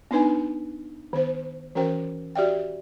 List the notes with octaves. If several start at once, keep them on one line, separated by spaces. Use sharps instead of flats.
B3 D4 D#4 B4 G#5
D#3 B3 C5
E3 C#4 F#4 A#4 C5 G5
F#4 G4 D5 E5 G5